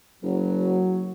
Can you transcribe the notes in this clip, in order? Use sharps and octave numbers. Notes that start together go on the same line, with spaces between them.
F#1 F#3